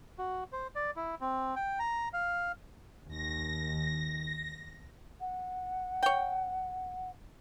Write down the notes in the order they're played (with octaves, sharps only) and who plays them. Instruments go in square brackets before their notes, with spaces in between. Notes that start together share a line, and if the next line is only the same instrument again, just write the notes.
[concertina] F#4
C5
D5
E4
C4
G5
A#5
F5
[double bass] D#2 D#3 [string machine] A#6
[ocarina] F#5
[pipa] C#5 G5